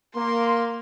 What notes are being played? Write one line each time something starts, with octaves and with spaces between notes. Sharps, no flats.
A#3 C6